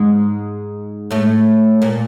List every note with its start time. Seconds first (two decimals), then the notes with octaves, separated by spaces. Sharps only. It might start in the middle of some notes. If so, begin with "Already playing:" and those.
Already playing: G#2 G#3
1.11 A2 A3
1.82 A#2 A#3